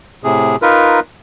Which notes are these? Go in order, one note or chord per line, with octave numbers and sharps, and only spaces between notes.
A2 C3 G#4
D#4 F4 A#4 B4